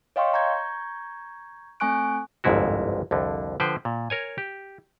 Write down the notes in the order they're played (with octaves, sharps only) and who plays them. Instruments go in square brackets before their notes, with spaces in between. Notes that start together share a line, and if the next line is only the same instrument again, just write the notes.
[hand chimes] C#5 D#5 F5 G5 C6 C#6
A#5 C#6 G6 G#6
A3 C4 G#5 C#6 F#6 D7
[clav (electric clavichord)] G1 C2 F2 G#2 E4 F#4
C2 F2 D3
D3 F3 B4 C5 G5
A#2
A#4 C#5 G#5
G4